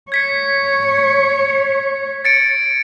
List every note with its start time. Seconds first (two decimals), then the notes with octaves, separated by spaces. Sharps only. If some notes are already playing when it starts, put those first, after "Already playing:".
0.12 C#5 G#6 B6 C#7
2.25 A6 C#7 D7